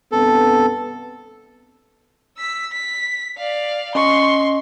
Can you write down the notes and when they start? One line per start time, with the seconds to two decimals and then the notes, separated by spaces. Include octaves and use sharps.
0.12 G2 C3 B3 A4
2.37 E6 B6
2.72 B6
3.37 D5 F5
3.95 C#4 D#5 C6 C#6